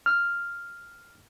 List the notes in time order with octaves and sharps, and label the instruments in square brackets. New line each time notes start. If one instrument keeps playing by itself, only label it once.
[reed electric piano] F6